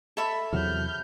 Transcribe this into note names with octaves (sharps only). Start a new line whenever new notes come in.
A4 E5 B5
E2 C3 F#3 F6 G6